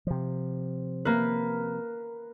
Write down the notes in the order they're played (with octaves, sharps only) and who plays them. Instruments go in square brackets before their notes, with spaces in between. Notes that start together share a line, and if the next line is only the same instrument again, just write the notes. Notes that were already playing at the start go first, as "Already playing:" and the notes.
[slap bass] C3 F3
[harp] A#3 B4